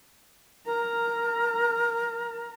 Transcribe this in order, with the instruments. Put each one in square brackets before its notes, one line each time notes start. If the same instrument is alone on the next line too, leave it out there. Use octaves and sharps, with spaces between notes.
[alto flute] A#4 [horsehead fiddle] A#5